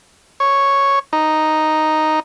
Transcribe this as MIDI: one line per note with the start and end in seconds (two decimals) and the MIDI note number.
0.40 0.99 73
1.13 2.20 63